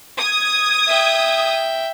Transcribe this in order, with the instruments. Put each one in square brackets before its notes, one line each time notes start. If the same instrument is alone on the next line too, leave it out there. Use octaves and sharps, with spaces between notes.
[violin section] D#6 G#6
[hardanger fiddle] E5 G5